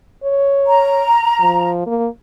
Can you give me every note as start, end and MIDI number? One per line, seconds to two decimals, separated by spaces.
0.23 1.04 73
0.67 1.69 82
1.40 1.85 53
1.86 2.07 58